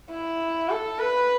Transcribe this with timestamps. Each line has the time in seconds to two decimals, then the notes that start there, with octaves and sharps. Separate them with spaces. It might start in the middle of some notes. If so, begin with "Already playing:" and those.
0.11 E4
0.69 A4
0.99 B4